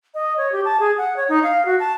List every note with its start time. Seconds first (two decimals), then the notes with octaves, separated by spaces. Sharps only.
0.14 D#5
0.38 C#5
0.52 G4
0.65 A5
0.80 G#4
0.98 F#5
1.17 C#5
1.29 D#4
1.43 F5
1.65 F#4
1.80 A5